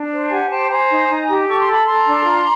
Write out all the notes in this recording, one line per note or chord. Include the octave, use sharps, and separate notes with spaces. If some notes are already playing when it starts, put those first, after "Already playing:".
Already playing: D4
C5
G4 F#5 G#5
C5 G5 A5
C5 G#5 A#5
D#4
D#4
G4
A4 C#6
C6
A4 B5
A4 A#5 C6
D4
F4